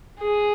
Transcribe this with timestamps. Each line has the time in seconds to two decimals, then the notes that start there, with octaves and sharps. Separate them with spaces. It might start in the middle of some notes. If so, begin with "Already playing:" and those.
0.19 G#4